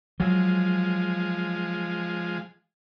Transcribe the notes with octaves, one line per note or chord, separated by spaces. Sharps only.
F3 F#3 G#3